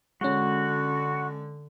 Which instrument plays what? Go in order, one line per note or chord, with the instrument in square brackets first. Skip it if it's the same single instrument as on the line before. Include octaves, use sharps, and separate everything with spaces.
[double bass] D3 [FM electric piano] G#3 C#4 [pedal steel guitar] F#4